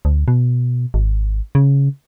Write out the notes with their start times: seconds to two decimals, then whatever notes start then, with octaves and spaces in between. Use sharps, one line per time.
0.05 D2
0.28 B2
0.94 G#1
1.55 C#3